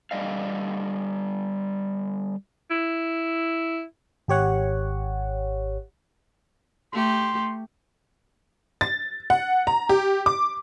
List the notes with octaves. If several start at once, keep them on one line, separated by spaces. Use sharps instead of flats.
D3 G3 D#5 F5
E4
G#1 G4 C#5 F#5
A3 G4 C6
A6
F#5
A#5
G4
D6